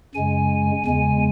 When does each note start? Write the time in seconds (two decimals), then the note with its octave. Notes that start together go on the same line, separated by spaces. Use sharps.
0.14 F#2 C#3 G#3 G#5
0.86 E2 C#3 G#3 G#5